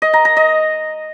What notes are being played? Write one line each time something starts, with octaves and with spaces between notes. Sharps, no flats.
D#5
A#5
A#5
D#5